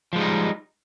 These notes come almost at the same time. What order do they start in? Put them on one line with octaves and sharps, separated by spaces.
F3 G#3 G3 D#4